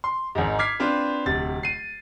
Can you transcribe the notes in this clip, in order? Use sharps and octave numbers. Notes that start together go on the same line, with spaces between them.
C6
G#1 G#2
D6 F6 G#6 B6 C7
C4 D4 F4 B4
D1 C3 A6
C7 D#7